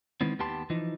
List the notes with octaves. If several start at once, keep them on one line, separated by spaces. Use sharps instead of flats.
D#3 E3 G#3 B3 C4
D#2 B3 G4 A5 C6
E3 F3 D#4